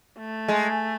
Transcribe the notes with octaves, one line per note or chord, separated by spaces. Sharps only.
A3
G#3